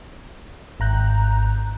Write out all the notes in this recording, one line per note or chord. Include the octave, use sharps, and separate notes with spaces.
G#1 A#5 F#6 G6